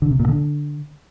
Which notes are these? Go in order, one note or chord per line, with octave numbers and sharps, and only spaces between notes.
D3
C3
A#2
D3